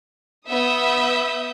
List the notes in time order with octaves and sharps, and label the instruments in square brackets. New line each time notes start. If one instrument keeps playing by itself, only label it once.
[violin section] B3 E5 D#6 G6